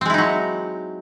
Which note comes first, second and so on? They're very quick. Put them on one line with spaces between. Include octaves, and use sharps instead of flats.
C4 G#3 E4 D#4 F#3